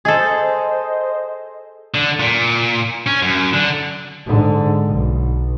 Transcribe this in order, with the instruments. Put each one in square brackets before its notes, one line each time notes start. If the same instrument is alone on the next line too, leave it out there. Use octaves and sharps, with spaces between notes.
[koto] G#4 A4 [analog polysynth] C5 D#5
[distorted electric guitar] D3
A#2
C#4
F#2
D3
[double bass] G#2 D3
B1